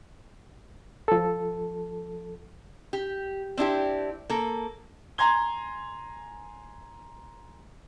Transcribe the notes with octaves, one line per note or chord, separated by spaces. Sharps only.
F3 A4
G4
C4 D4 E4 G4
A#3 A4
G#5 A#5 C6 G#6 G7